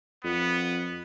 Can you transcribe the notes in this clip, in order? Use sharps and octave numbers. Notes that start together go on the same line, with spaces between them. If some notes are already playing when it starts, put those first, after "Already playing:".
F2 B3